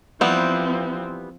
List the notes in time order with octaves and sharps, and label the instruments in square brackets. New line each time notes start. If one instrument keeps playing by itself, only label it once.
[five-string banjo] E3 G3 B3 [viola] F3 C4